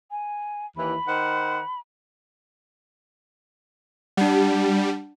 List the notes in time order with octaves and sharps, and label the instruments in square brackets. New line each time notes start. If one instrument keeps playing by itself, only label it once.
[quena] G#5
[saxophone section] D#2 E3 [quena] B5
[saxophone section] D#3 C5 F#5
[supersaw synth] G3 [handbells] D4 F#5